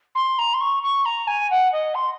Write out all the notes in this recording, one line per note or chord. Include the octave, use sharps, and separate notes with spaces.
C6
A#5
C6
C#6
C#6
A#5
G#5
F#5
D#5
C6